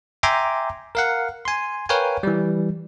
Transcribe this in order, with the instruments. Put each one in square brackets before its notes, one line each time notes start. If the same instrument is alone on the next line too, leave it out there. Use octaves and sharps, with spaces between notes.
[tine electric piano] E5 G5 G#5 A#5 C6 D6
A#4 F5 F#5
G#5 C6
A#4 B4 C#5 F5 G5 G#5
E3 G3